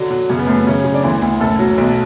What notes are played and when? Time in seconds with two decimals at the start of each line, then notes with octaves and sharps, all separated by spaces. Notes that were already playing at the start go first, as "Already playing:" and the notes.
Already playing: D3 F#3 D4
0.11 F#3
0.29 F#2 C#3 C#4
0.39 B3
0.47 F#2 A3
0.57 B3
0.66 F#2 C#3 C#4
0.85 C#3
0.94 D4
1.03 D2 E3 E4
1.22 D2
1.40 F#1 A3 A4
1.59 F#3
1.78 B1